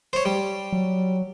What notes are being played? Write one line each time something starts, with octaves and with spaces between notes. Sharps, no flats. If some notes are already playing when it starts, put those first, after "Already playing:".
C5 C#5
G3
F#3